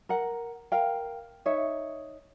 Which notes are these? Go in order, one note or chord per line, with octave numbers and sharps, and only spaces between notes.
A#4 F#5
A#4 F5 G5
D#4 C#5 E5